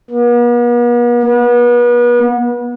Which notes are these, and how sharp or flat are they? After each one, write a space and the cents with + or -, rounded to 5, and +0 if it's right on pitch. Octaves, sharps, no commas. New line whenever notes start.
B3 -45
B3 -35